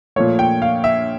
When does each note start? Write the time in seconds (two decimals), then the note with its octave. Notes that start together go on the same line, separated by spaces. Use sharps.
0.16 A#2 F3 A3 C#5
0.39 G5
0.62 F5
0.84 E5